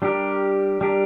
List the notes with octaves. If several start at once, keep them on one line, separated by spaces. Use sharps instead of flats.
G3 D4 G4 A#4
G3 D4 G4 A#4